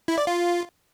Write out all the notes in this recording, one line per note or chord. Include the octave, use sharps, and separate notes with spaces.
E4
D5
F4